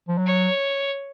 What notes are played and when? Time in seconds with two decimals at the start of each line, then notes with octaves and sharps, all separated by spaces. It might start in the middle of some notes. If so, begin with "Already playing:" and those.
0.08 F3
0.18 F#3
0.26 C#5